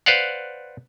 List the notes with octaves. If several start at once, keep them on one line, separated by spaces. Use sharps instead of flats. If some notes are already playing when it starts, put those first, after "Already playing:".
B4 C5 D5 F5 F#5